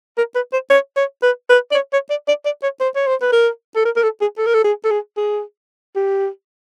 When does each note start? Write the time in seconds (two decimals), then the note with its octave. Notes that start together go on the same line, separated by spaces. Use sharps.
0.18 A#4
0.35 B4
0.53 C5
0.70 C#5
0.96 C#5
1.23 B4
1.50 B4
1.71 D5
1.75 C#5
1.93 C#5
2.10 D5
2.28 D5
2.45 D5
2.63 C#5
2.80 C5
2.95 C#5
3.07 C5
3.21 B4
3.32 A#4
3.76 A4
3.85 A#4
3.96 A#4
4.03 A4
4.21 G#4
4.38 A4
4.46 A#4
4.54 A4
4.64 G#4
4.85 A4
4.91 G#4
5.17 G#4
5.96 G4